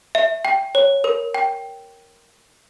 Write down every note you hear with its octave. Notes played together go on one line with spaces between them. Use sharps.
E5
G5
C#5
A#4
G5